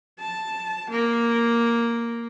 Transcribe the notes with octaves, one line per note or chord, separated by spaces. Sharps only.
A5
A#3